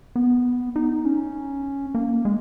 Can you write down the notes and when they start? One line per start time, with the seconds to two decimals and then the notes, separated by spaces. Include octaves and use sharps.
0.16 B3
0.76 D#4
1.05 C#4
1.95 A#3
2.25 G#3